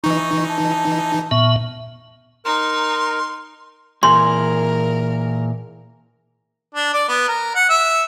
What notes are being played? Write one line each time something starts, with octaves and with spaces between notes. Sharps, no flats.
E3 D#4 C#6
A5
A#2 B3 E5 C#6
D#4 A#4 C6
A#2 E3 G#4 A#4 C6
D4
D5
B3
A#4
F#5
E5